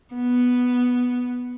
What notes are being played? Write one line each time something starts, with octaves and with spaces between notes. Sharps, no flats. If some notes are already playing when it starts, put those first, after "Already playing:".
B3